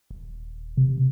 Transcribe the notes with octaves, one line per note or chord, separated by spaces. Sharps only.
D#1
C3